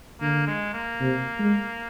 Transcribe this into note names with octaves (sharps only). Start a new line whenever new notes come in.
D3 A#3
G#3
A#3
C3
G#3